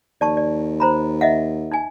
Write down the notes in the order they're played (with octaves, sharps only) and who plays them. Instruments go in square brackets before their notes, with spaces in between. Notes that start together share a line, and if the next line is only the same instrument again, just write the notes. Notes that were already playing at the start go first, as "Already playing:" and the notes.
[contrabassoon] D#2 [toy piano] D5 A5 C#6
[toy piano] D5
C5 A#5 B5
D#5 E5 F#5
D#4 G#5